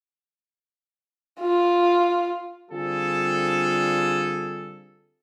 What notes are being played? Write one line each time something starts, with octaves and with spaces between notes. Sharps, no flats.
F4
D3 G3 C4 F4 G#4 A4